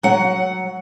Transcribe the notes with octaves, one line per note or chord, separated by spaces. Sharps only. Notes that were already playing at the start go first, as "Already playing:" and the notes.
F#3 F#5